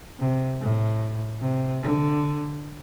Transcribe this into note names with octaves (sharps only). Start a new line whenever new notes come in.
C3
A2
C3
D3